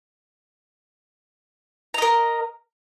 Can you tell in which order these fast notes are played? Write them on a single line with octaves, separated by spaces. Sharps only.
A#5 D#5 A#4